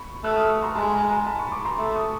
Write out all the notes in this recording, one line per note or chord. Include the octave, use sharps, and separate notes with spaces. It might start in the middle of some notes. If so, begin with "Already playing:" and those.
Already playing: B5 C#6
A3 E6 F#6
D#6 F6
C#6 D#6
A#5 C6
G#3 A5 B5
G#5 A#5
G#5 A#5
A5 B5
B5 C#6
C6 D6
A#5 C6
A3
C#6 D#6